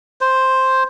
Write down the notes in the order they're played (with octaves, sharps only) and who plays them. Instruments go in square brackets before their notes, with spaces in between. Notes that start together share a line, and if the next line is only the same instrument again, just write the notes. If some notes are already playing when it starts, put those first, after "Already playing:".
[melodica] C5